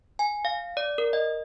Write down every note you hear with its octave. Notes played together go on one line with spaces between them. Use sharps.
G#5
F5
D5
A#4
D#5